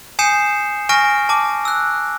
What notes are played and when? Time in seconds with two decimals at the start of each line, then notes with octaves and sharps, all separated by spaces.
0.19 G#5 D#6 G6 C7 C#7 E7
0.89 G#5 C#6 F6 A#6 D7
1.29 A5 D6
1.65 E6 F#6